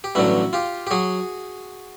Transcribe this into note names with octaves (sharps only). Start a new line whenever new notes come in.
G4
A1 G2 D3 F#3 E4 F#4
F4 G4
G4
F#3 F#4 G#4